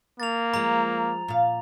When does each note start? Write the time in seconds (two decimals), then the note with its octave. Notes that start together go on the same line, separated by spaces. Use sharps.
0.20 A#3 A6 F7
0.54 F3 G#3 A#5
1.28 A#2 F5